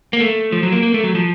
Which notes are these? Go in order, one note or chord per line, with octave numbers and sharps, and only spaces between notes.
A#3
A3
F3
F#3
A#3
A#3
A3
F#3
F3